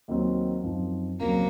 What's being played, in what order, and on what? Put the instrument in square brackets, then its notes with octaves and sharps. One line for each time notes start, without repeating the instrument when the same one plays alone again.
[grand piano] D#2 D#3 F#3 C4
F#2 F3 C4 D#4
[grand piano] D#2 C#3 F3 C4 F#4 [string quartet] F#3 A#3